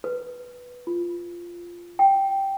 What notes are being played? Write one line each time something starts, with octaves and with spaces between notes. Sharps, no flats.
B4
F4
G5